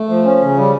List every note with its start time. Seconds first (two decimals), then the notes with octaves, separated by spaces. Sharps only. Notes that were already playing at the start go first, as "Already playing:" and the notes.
Already playing: A3
0.09 F3
0.24 C#4
0.41 C#3
0.56 G3